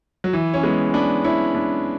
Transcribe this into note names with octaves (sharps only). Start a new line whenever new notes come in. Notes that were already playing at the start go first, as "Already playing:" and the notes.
F#3
E3
C#4
G#3 B3
B3 D4
C#4 E4
B3 D4